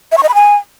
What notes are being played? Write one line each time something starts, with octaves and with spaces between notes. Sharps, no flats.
E5
C#6
D#5
B5
G#5